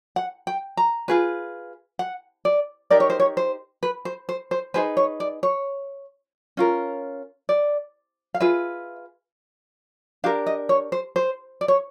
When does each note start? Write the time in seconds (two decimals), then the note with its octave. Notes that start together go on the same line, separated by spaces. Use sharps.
0.16 F#5
0.47 G5
0.77 A#5
1.08 F4 G#4 B4
1.99 F#5
2.45 D5
2.90 D#4 G4 A#4 D5
3.00 C#5
3.10 C5
3.20 C#5
3.37 C5
3.83 B4
4.05 C5
4.29 C5
4.51 C5
4.74 D#4 G#4 B4 C5
4.97 C#5
5.20 D5
5.43 C#5
6.57 C#4 F4 A#4
7.49 D5
8.34 F5
8.40 F4 G#4 B4 E5
10.24 D4 G4 A#4 F5
10.47 D#5
10.69 C#5
10.92 C5
11.16 C5
11.61 D5
11.68 C#5